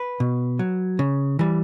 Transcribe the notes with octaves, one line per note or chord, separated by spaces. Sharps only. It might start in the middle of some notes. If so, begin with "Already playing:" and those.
Already playing: B4
B2
F#3
C#3
E3 G3